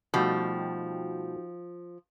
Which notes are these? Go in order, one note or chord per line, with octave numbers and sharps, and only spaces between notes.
B2 F3 G3 A3 D#4 F#4 G5